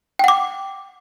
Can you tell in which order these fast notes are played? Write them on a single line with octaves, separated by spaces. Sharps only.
G5 F#5 D6